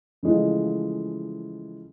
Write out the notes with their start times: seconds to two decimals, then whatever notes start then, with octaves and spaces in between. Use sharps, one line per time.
0.23 C#3 E3 F3 G#3 A3